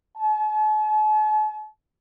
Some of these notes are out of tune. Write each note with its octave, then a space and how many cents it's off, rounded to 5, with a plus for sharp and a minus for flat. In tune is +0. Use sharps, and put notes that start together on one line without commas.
A5 -45